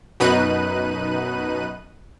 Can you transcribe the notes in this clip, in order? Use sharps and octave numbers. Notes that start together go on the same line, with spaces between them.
F#2 B2 D#4 B4 F#6 D#7